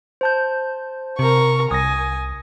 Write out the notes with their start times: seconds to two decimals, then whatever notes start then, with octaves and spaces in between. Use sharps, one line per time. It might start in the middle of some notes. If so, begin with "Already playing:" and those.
0.21 C5 A5 G6
1.19 C3 A#4 C#6
1.71 C2 G#5 D#6 A#6